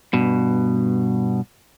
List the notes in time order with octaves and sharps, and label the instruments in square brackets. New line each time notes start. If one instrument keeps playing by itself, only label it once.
[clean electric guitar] G2 B2